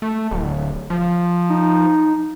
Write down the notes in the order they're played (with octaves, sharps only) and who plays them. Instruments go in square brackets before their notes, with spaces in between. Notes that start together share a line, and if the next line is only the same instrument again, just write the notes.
[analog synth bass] A3
D1
F3
[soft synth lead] D#4